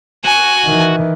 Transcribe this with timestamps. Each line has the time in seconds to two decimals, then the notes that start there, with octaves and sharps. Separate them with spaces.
0.25 F#4 G#5
0.65 D#3 E3